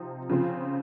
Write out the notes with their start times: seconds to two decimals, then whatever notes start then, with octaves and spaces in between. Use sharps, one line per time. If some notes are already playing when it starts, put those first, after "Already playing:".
Already playing: C3 F3 C4 D#4
0.29 C#3 F3 C4 F4 G#4